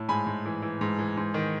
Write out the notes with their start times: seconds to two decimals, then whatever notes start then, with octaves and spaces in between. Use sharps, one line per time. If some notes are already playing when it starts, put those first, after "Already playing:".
Already playing: A2
0.09 G#2 G#5 B5
0.26 G#2
0.46 E3
0.62 E3
0.81 G#2
0.99 E3
1.17 G#2
1.34 D#3